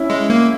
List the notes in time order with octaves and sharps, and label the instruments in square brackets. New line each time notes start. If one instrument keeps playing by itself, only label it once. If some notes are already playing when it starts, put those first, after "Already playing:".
Already playing: [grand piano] C#4 E4
[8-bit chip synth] G#3
A#3